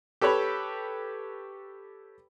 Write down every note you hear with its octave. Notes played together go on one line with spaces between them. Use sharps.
G4 A4 B4 C#5 B5